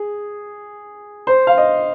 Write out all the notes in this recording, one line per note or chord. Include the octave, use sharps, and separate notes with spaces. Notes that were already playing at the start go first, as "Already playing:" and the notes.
Already playing: G#4
C5
F5
D#5